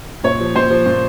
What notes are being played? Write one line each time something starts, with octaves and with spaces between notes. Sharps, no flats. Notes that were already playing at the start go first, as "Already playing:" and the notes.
A#2 C#5
F3
A#2 C5
F3
A#2